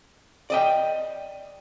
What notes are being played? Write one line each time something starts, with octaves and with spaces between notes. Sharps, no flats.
D5 D#5 G5